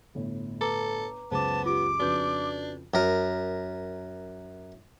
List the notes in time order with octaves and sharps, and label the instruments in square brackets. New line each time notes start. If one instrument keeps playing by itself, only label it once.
[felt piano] G1 A2
[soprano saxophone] A4 [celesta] B4 A#5 D6
[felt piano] C#2 F#2 C#3 [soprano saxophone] B3 [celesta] C5 D6 [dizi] A5
[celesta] F4 G4 [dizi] D6
[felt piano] F2 C#3 [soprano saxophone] D4 [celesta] F#4 B4 G6
[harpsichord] F#2 A#4